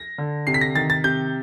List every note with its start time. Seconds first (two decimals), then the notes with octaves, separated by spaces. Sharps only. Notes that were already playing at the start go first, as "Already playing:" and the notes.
Already playing: A#6
0.18 D3
0.47 C3 C7
0.54 B6
0.61 A#6
0.75 D#3 A6
0.90 A6
1.04 C3 G6